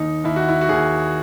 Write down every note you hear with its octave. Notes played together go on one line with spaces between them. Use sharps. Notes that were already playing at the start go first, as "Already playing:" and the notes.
Already playing: D#2 D#4
D#2 E4
F#4
E4
F#4
D#2 G#4